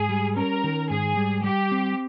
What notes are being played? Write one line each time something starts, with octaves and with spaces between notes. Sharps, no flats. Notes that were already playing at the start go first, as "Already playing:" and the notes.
Already playing: G#2 G#4
G3
C#4 A#4
D#3
G#2 G#4
G3
G3 G4
C4